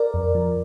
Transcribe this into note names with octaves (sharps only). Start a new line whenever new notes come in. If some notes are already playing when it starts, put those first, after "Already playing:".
Already playing: A#4 D5
F2
F3